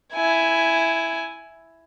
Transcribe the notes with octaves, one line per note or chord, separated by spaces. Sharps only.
E4 G#5